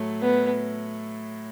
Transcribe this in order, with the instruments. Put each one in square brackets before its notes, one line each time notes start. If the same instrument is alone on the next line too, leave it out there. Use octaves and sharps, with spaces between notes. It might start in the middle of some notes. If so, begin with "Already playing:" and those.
Already playing: [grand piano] A2 F#3 A3
[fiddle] B3